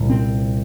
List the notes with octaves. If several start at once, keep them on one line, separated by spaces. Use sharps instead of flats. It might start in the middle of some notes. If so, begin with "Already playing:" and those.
Already playing: C2 A#2
C4